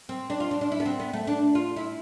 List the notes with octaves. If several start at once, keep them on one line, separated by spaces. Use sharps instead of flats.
C4
D4
F4
D4
D4
E4
B3
C4
B3
A3
D4
F4
E4